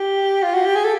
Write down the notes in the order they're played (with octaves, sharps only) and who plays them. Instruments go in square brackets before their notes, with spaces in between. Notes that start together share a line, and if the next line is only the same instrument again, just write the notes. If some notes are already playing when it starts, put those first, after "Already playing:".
Already playing: [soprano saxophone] G4
F4
F#4
G4
G#4
A4